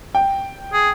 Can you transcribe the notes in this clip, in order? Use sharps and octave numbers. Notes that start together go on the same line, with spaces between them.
G5
G#4